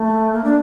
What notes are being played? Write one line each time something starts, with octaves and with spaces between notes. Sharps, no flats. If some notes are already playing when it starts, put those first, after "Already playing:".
Already playing: A3
A#3
D4